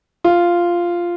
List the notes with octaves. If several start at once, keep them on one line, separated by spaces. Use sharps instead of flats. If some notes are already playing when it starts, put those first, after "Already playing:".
F4